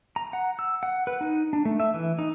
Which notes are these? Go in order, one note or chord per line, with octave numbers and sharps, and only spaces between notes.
A#5
F#5
E6
F#5
B4
D#4
D4
A3
E5
E3
D#4